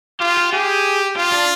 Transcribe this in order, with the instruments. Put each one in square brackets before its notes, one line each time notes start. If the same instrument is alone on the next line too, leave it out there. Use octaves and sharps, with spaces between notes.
[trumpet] F4 [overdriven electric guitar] G4
[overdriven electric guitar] G4
[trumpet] G4 [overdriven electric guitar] G#4
[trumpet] F4 [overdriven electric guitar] G4
[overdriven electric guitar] D4